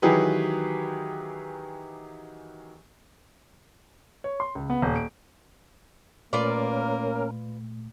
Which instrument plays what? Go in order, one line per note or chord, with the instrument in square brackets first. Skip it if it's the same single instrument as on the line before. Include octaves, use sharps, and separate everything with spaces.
[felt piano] D#3 E3 F#3 G4 G#4 B4
[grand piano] C#5
C6
C#2
B3
D#1
D7
[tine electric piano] A#2 A3 [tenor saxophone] A#3 [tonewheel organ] C#4 A#4 [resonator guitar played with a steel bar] F4 B4 D5